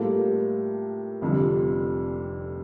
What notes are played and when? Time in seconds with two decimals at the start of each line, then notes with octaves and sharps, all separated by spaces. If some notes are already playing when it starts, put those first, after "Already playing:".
Already playing: A2 G3 A#3 F4 A4
1.21 F1 F2 D3 G3